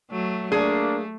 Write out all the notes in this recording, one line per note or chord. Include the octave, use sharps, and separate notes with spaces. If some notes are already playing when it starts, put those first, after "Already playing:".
F#3 A3
A3 A#3 D4 G#4